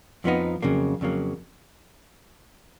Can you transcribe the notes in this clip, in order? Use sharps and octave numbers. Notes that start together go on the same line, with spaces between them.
F2 F3 B3 D#4
F2 C#3 F#3 A#3
F2 C#3 F#3 A#3